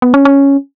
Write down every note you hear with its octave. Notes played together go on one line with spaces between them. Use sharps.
B3
C#4
C#4